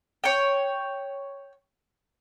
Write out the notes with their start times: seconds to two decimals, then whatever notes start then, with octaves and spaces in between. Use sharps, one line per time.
0.24 C#5 G5